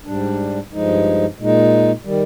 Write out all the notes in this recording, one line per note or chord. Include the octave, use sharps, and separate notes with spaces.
G#2 G3 D4
G2 F3 G#3 D#4
A#2 G#3 D#4
D#3 G3